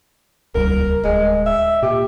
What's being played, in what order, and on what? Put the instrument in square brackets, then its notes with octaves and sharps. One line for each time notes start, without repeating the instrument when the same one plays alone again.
[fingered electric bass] D#1 C#2 G3 [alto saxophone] A#4
[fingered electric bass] D1 [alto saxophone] G#3
[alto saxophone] E5
[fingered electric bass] A#2 [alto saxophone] G4